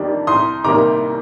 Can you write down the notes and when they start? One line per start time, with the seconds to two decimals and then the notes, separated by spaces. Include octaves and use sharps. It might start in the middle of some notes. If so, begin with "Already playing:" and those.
Already playing: F2 D#3 G3 D4
0.27 C2 C6 D#6
0.64 C3 D#3 G3 A#3 A#5 D6